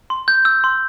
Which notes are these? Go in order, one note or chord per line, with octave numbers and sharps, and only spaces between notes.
C6
G6
E6
C6